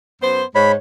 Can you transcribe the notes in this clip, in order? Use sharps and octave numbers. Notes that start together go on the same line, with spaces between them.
F#2 B3 C5
G#2 C#5 B5